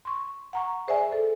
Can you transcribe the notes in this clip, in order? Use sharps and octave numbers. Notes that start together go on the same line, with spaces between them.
C6 C#6
F#5 A#5 C#6
G#4 C5 D5 E5 G#5
A4